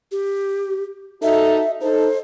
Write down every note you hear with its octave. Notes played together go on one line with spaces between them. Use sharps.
G4
D#4 F#4 A4 E5
D#4 A4 C5